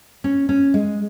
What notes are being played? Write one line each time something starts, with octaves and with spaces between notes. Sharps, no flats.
C#4
C#4
G#3